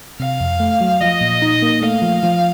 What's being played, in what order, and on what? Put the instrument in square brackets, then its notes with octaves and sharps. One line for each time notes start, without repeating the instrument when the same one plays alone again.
[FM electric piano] C3 [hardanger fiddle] F5
[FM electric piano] F2
A3
F#3
[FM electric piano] F3 [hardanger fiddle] D#5
[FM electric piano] A#2
D#4
A#3
[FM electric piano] A3 [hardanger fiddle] F5
[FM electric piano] F3
F3